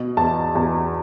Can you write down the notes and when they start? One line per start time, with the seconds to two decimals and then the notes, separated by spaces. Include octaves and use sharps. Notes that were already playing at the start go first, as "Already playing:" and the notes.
Already playing: B2
0.17 E2 A5
0.55 E2